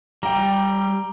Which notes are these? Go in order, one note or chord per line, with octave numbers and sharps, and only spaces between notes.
G3 G5 A#5